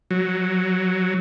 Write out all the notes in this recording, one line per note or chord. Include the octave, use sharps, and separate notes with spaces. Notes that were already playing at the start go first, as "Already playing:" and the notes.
F#3